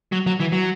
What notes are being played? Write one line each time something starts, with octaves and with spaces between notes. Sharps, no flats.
F#3
F#3
E3
F#3